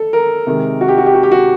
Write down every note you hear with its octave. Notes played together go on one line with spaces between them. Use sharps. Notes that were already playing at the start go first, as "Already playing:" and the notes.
Already playing: A4
A#4
C3 D#3 G#3
F#4
G4
F#4
G4
F#4
G4
F#4